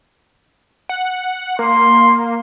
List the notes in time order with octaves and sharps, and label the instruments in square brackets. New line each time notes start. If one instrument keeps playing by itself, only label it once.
[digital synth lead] F#5
[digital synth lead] A#3 [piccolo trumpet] C6